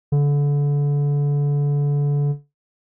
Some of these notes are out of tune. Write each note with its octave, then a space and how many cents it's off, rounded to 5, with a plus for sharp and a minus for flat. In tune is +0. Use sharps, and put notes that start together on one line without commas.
D3 -30